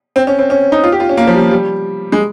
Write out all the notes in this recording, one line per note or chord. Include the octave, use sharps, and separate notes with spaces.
C4
C#4
C4
C#4
D#4
F4
G4
F4
C#4
A#3
F3
G3
G3
G#3